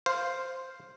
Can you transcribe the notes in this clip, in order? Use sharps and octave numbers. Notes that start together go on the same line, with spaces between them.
C5 F5